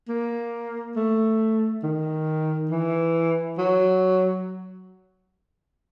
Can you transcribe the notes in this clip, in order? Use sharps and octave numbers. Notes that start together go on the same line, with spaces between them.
A#3
A3
D#3
E3
F#3